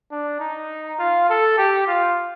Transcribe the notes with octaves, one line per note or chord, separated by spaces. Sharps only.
D4
D#4
F4
A4
G4
F4